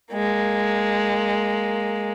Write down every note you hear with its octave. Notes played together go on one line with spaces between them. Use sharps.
G#3 A#3